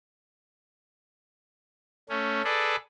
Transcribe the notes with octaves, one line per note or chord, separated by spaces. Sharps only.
A3 C#4
G#4 A4 B4 D5